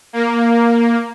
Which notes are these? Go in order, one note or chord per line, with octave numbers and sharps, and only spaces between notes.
A#3